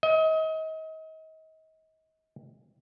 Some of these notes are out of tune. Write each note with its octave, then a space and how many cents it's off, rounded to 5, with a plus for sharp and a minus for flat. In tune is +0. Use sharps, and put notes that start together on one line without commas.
D#5 +35